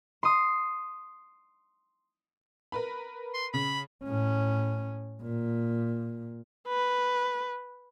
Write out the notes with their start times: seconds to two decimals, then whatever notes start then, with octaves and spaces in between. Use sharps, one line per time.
0.23 C6 D#6
2.72 A#4 B4 B5
3.34 C6
3.54 C#3 B5
4.04 A2 C#4
5.22 A#2
6.68 B4